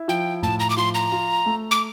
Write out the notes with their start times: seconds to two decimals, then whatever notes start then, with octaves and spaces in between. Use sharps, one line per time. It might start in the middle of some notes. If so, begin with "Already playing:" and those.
Already playing: E4
0.08 F3 G5
0.42 A2 A5
0.60 A#5
0.70 D6
0.77 F3 C6
0.94 A#5
1.12 F4
1.46 A3
1.71 D6